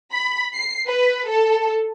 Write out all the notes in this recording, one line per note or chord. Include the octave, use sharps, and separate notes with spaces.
B5
C7
B4
A4